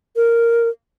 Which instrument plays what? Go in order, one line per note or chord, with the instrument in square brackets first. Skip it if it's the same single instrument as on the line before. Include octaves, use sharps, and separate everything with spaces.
[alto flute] A#4